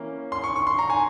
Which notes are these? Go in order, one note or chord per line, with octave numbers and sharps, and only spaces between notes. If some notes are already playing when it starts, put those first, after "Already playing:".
Already playing: E3 A#3 C#4
C6
C#6
C#6
C6
A#5
G#5